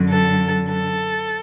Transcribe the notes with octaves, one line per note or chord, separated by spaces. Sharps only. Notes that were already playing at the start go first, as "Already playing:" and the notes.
Already playing: F#2 D3 F#3
A4
A4